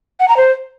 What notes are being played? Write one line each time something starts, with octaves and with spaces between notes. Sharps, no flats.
F#5
A#5
C5